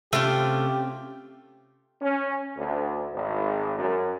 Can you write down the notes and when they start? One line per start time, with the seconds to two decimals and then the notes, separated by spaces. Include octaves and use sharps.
0.13 C3 A3 C4 C#4 F4 G4
2.01 C#4
2.57 D2
3.12 G#1
3.78 F#2